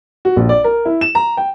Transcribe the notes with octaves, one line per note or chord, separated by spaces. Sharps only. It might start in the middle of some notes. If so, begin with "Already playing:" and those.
F#4
A#1
D5
A#4
E4
E7
A#5
G5